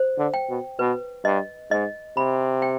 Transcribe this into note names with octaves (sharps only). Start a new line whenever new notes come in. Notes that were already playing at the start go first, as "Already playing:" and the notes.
Already playing: C5
D3
G5
B2
B2 B4
G2 D#5
G#2 D#5
C3 B5
G5